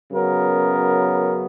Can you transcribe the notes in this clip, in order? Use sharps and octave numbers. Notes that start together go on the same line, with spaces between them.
F#2 C#3 F#3 B3 A#4